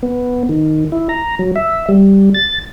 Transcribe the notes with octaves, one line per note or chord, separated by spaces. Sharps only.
B3
D#3
E4
A#5
F#3
E5
G3
A6